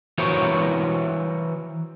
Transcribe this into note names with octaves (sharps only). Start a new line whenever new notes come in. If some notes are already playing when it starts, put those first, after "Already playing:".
E3 E4 F#4 A#4 C5 C#5